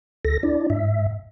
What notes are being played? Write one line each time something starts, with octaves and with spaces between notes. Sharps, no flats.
D2 A4 A#6
D4 E4 D5
G#2 E5